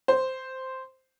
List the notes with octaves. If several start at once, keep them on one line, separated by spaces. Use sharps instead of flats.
C5